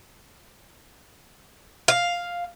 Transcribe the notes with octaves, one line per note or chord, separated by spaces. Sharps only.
F5